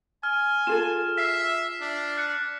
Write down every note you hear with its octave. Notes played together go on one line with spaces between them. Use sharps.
G#5 F6
F4 G#4 A4 E7
E5 B6 C7
D4
F#6 C#7